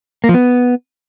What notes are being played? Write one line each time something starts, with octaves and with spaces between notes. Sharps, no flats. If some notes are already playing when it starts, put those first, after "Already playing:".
A#3
F3
B3